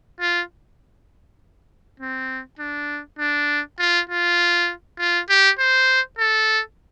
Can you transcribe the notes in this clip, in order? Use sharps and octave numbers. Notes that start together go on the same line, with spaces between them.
F4
C4
D4
D4
F4
F4
F4
G4
C5
A4